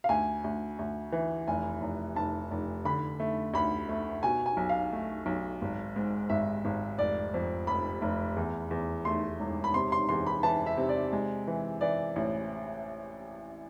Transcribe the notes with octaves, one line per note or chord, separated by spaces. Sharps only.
F5
D2 G#5
D2
D2
E3
F1 G#5
F1
F1 A5
F1
D3 B5
A3
D2 B5
A3
B2 G#5
G#5
B1
F5
A3
B1
G#1
G#2
G#1 E5
G#1
F1 D5
F2
F1 B5
F1
E2
E2
A3 C6
E1
B5
C3 C6
C6
E2 C6
B5
E3 A5
E5
C3
D5
G#3
E3
E3 D5
A1